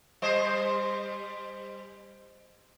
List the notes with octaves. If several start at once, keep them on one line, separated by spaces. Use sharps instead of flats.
G3 C5 D#5